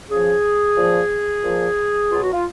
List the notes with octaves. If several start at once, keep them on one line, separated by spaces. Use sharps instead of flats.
C#3 F3 G#4
A#2 F3
A#2 F3
B2 F#3 F4
F#4
F4